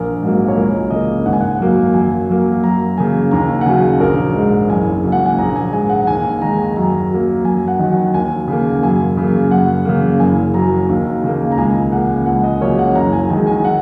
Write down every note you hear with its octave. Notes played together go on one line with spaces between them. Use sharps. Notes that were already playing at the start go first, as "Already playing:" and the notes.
Already playing: A#1 A#4
G#2 F#3 A#3
C#5
C#2 A#4
C#3 A#3 D#5
G#1 F#5
G#5
F#5
F#2 F#3 A#3
F#2 G#5
F#3 A#3
F#2 A#5
C#3 A#3 G#5
D#2 A#5
F#5
C#3 F#3 G#5
A#1 A#4
G#2 G#3
F#1 G#5
F#2 C#3 A#3
F#5
G#5
A#1 A#5
G#5
G#2 G#3 G#5
F#5
D#2 G#5
G#5
D#3 G#3 A#5
G#5
F#2 A#5
F#3 A#3
F#2 G#5
F#5
D#3 F#3
F#5
D#2 G#5
C#3 A#3
F#2 G#5
C#3 A#3
F#2 F#5
C#3 A#3
F#1 G#5
F#2 F#3 A#5
D#2
C#3 A#3
A#5
C#2 G#5
C#3 A#3 F#5
C#2 F#5
D#5
C#3 F#3 A#3 C#5
F#5
F#1 A#5
G#5
F#2 D#3 G#3 G#5
G#5
F#5